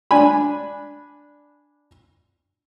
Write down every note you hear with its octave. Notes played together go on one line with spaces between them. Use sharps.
D4 G#5 B5